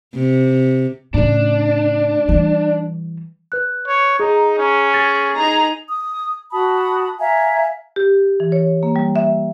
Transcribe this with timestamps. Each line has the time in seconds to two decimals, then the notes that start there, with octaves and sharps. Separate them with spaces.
0.14 C3
1.14 A2 C#3 D4
2.29 E3 G3
3.52 B4 F#6
3.88 C#5
4.20 D#4 G#4 A#5
4.58 C#4
4.94 G#4 A6
5.36 D#4 G#4 A#5
5.88 D#6
6.52 F#4 A5 B5 D#6
7.20 E5 F5 G#5 A#5
7.96 G4
8.40 E3
8.52 C#5
8.83 A#3
8.96 G3
9.16 E5